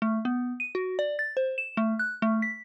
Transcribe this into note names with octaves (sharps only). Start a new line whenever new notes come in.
A3
B3
D#7
F#4
D5
A6
C5
E7
A3
F#6
A3
B6